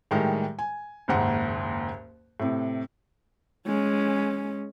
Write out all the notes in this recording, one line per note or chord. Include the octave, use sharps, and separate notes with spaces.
A2 D#3 G3 G#3
G#5
F#1 D#2 G#2 F#5
A2 C3
G#3 C#4